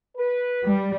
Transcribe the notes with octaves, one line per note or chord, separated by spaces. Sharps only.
B4
G3